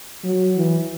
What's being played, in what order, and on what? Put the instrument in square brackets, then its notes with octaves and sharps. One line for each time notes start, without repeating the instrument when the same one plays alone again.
[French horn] F#3
E3